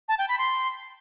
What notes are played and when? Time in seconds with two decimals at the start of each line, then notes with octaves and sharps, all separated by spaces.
0.09 A5
0.19 G5
0.29 B5
0.38 C6